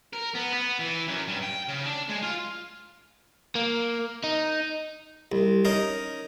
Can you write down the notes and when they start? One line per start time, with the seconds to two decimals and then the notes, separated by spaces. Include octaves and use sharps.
0.13 A#4
0.35 B3
0.53 B3
0.79 E3
1.07 F#2
1.28 G2
1.43 G5
1.69 C#3
1.86 D4
2.09 G#3
2.23 F4
3.55 A#3
4.24 D#4
5.32 C2
5.65 C#4 D#4 A#4